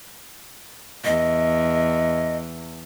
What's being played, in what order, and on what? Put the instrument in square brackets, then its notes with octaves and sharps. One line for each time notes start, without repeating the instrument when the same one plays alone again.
[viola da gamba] E2 [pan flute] D#5